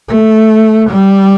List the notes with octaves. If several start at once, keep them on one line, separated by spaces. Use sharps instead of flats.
A3
G3